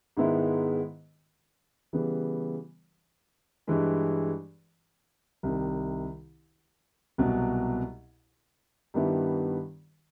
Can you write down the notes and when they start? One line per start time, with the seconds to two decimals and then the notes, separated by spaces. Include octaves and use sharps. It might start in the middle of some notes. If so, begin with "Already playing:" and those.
0.17 G#2 D#3 G#3 B3 E4
1.93 C#3 E3 G3 B3
3.67 G2 E3 G#3
5.43 C2 C3 D#3
7.18 C2 B2 F#3
8.94 G2 D#3 G3 B3 E4